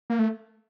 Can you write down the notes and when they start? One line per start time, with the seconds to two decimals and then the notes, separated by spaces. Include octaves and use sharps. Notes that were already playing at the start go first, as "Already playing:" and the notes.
0.10 A#3
0.19 A3